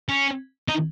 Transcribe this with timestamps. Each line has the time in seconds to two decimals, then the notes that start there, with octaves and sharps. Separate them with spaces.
0.09 C#4
0.68 D#4